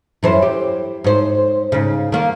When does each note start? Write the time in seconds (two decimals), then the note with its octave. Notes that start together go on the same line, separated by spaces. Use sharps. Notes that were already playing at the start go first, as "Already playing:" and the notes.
0.23 F#2 E3 C5
0.42 G4
1.04 G#2 C5
1.72 G#2 C#3
2.12 D#3 A#3